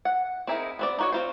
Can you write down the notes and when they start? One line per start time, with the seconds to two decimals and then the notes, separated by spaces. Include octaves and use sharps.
0.05 F#5
0.47 C4 D#4 E4 G#4 A#4
0.79 B3 C4 D5
0.99 D#4 F#4 C#5
1.12 C4 F4 C5